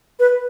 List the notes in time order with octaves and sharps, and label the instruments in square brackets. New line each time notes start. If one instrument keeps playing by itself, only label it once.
[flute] B4